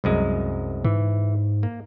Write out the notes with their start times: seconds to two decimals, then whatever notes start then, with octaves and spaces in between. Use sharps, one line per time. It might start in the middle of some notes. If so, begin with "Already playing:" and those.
0.04 C2 F#2 G#3
0.85 G#2 E3
1.63 A#3